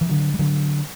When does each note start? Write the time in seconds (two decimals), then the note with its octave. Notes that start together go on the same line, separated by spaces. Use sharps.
0.01 E3
0.09 D3 F#3
0.34 G3
0.39 D3 F#3